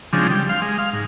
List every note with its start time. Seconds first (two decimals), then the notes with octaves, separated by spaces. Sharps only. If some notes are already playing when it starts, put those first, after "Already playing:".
0.13 C#3 F3 G#3 C4 D4
0.30 G3
0.49 F5 C6
0.62 G#3
0.78 F5
0.93 G#2